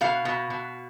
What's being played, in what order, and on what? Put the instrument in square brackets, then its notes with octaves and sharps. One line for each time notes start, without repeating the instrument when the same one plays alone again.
[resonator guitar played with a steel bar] B2 F5
B2
B2